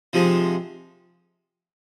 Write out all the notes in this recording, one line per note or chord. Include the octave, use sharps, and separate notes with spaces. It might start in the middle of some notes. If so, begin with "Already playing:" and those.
C3 F3 G#3 D#4